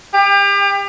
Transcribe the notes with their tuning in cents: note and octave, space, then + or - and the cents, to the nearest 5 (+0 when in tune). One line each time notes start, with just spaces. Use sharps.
G4 +35